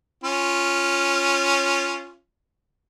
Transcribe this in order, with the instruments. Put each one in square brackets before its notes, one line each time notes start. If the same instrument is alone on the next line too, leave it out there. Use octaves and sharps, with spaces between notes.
[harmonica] C#4 F4